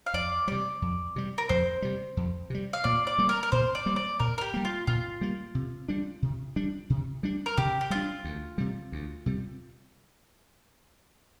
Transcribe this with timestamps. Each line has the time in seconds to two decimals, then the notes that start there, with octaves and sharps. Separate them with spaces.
0.06 F5
0.14 F2 D5
0.48 C3 G3 D5
0.82 F2
1.16 C3 G3
1.38 A#4
1.49 F2 C5
1.82 C3 G3
2.17 F2
2.50 C3 G3
2.73 F5
2.84 A#2 D5
3.07 D5
3.18 G3 A#3
3.29 A#4
3.43 A#4
3.52 A#2 C5
3.75 D5
3.86 G3 A#3
3.96 D5
4.20 A#2 A#4
4.38 A#4
4.41 G4
4.54 G3 A#3
4.65 F4
4.87 A#2 F4
5.21 G3 A#3
5.55 C3
5.89 G3 D4
6.22 C3
6.56 G3 D4
6.90 C3
7.23 G3 D4
7.46 A#4
7.57 C3 G4
7.81 G4
7.90 G3 D4 F4
8.25 D2
8.58 C3 G3
8.92 D2
9.26 C3 G3